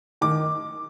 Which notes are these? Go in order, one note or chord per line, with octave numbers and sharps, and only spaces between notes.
D#3 D6